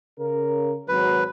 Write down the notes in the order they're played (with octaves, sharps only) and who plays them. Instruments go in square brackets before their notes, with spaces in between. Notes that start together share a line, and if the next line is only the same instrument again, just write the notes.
[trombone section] C#3 A#4
[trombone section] G#1 F#3 [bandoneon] B4